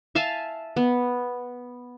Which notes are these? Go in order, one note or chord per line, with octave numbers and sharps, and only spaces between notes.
E5 F5 G#5 A5
B3